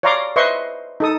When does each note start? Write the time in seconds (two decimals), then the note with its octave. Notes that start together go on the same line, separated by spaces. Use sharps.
0.03 C#5 D5 F5 A#5 C6 D6
0.36 B4 C5 D#5 E5 C6 C#6
1.00 D#4 A4 D#6